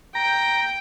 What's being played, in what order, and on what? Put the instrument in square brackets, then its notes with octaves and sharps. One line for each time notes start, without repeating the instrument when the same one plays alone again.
[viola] G5 [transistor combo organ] A#5